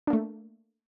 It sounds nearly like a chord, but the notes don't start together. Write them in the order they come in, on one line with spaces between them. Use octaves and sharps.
D4 A#3 A3